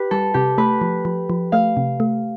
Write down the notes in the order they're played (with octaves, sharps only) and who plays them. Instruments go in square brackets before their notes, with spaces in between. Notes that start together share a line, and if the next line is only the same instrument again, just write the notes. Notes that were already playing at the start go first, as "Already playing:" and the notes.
Already playing: [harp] G4 B4
[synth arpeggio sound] G3 [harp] A4
[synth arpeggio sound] C3 [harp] G4
[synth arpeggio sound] A3 [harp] B4
[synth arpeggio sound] F3
F3
F3
[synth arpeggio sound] A3 [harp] F5
[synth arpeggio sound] C3
A3